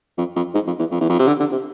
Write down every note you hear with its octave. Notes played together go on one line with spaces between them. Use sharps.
F2
F2
G#2
F2
E2
F2
E2
F2
C3
D3
D3
C3